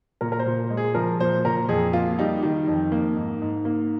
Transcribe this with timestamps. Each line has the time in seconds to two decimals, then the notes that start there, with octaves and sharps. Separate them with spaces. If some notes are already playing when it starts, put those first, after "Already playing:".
0.21 A#2 A#4
0.32 A#4
0.39 C5
0.46 A#2
0.70 G#3
0.77 G#4
0.95 F3 A#4
1.20 A#2 C5
1.45 A#2 A#4
1.69 F2 G#4
1.93 A#3 F4
2.18 G3 D#4
2.43 D#3
2.68 F2
2.92 A#3
3.16 G#2
3.42 G#2
3.65 A#3